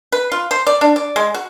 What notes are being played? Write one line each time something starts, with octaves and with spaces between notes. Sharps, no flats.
B4
F4
C5
D5
D4
D5
G#3
F#4